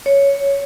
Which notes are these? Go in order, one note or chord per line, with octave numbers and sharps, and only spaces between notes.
C#5